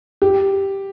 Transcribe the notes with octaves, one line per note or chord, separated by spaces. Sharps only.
G4